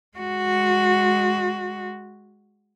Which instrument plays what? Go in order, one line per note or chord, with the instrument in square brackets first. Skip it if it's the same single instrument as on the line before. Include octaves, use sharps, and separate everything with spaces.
[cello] G#3 F#4